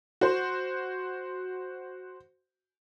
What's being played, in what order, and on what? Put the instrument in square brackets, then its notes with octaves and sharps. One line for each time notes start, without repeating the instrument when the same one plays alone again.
[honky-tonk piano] F#4 C5